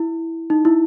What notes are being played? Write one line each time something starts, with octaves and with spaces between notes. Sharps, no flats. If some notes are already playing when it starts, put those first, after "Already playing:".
Already playing: E4
D#4
E4